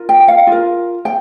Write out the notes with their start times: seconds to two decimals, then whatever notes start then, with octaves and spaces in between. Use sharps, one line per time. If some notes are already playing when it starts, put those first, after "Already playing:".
Already playing: F4 A#4
0.09 G5
0.28 F5
0.47 F4 A#4
1.05 G5